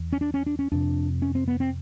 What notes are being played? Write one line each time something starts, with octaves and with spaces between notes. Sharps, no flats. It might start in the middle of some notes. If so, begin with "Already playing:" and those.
Already playing: E2
C#4
D4
C#4
D4
C#4
F2 C3 D4
C#4
C4
B3
C4